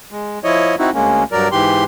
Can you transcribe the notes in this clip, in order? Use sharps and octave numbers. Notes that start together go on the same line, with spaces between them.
G#3
F3 E4 C#5 D#5
C4 D#4 E4 F#4
D2 G#3 A#3 C#4
G2 F#3 A#4 D5
G#2 E3 G4 C6